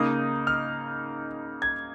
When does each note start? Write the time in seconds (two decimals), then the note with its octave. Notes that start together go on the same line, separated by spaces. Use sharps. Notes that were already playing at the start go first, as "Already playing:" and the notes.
Already playing: C#3 A#3 D#4 D#6
0.47 F6
1.62 G#6